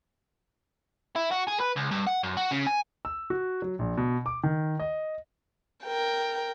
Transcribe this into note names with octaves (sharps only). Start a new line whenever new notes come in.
E4
F#4
G#4
B4
C#2
G2
F#5
F#2
F#4
C#3
G#5
E6
F#4
F#3
A#1
B2
D6
D#3
D#5
A#4 G5